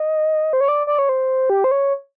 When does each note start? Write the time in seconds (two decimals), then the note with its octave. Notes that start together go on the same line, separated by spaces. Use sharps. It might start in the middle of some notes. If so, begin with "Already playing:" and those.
Already playing: D#5
0.53 C5
0.61 C#5
0.68 D5
0.87 D5
0.99 C#5
1.09 C5
1.50 G4
1.64 C5
1.71 C#5